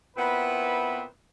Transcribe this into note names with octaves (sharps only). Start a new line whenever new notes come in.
A#2 B3 C4 E4 B4